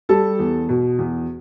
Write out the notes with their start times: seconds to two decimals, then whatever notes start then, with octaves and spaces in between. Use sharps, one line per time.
0.09 G3 A4 A5
0.39 E2
0.69 B2
0.98 E2